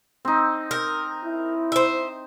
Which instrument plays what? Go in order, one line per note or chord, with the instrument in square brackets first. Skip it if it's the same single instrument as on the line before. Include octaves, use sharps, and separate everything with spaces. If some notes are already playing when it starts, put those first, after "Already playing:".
[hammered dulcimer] C4 D#4
[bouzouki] A#4
[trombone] E4
[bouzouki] C5 E5